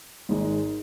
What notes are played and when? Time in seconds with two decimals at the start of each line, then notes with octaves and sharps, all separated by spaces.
0.29 G#1 G#2 G#3 D#4 A#4